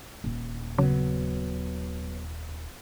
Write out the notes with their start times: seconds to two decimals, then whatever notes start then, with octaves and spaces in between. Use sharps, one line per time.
0.24 D#1
0.78 C#3 F#3 B3